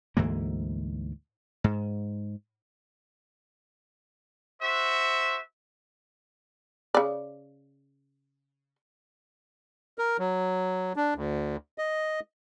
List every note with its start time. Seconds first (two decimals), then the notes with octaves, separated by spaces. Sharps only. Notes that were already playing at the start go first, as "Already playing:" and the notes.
0.17 D2 G#2 E3 A#3
1.64 G#2
4.62 F#4 C5 E5
6.94 C#3 D5
9.98 A#4
10.19 F#3
10.96 D4
11.15 D2
11.78 D#5